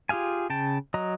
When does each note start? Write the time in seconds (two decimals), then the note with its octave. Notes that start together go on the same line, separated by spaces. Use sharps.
0.09 F4 G4 G#4 F5 G#5
0.50 C#3 G5 A5
0.94 F#3 D#5 A#5